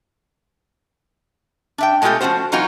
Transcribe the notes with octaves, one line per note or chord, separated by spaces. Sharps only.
D4 E5 G5
B2 G#3 A3 F4 G4 A4
F3 A3 C#4 F#4 C5
E3 F#3 A#3 D#4 F4 F#4